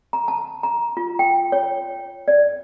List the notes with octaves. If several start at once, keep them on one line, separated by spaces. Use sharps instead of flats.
A#5
A5
A#5
F4
G5
C#5
D5